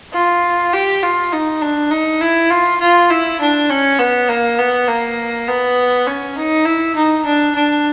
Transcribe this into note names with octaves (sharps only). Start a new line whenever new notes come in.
F4
G4
F4
D#4
D4
D#4
E4
F4
F4
E4
D4
C#4
B3
A#3
B3
A#3
B3
C#4
D#4
E4
D#4
D4
D4